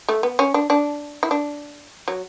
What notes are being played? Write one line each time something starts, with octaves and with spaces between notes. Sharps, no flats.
A3
B3
C#4
D4
D4
E4
D4
F#3